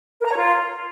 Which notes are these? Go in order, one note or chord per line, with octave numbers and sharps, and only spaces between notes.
A#4
A#5
C#5
F4